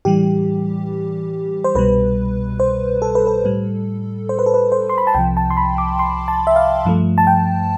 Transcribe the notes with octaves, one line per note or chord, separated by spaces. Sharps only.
A2 E3 G3 G4
C5
C2 B2 G3 B4
C5
A4
B4
A4
A2 G3
C5
B4
A4
B4
C5
C6
B5
A5
C2 C3 F3 G5
A5
C6
B5
D6
C6
A5
E5
F5
G2 F3 A3
A5
G5